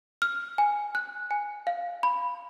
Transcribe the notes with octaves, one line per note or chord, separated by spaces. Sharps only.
F6
G#5
F#6
G#5
F5
B5